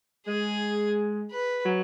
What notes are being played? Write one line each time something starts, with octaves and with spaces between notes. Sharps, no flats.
G#3 G#4
B4
F#3